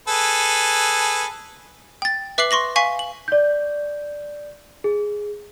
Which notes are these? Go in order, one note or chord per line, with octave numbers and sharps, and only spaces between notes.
G#4 A4 B4
G5 A6
B4 E5 D6 F#6 C7 F#7
C6 C#6 A#6 F#7
F5 G#5 C#6 B6
F#7
D5 G6
G#4